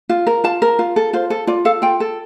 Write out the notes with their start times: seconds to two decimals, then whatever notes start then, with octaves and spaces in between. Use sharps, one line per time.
0.09 F4
0.27 A#4
0.44 F4 A5
0.62 A#4
0.79 F4
0.96 A4
1.13 F4 C5
1.30 A4
1.47 F4 D5
1.65 A4 F5
1.82 F4 G5
2.00 A4